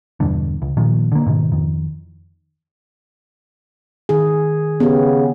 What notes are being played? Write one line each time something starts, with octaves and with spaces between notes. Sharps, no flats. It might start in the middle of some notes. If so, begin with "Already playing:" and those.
E2 G2 B2 D3
C#2
A#2 D#3 F3
D3 A#3
G#2 B2 D#3
F2 D#3
D#3 G#4
C#3 B3 G4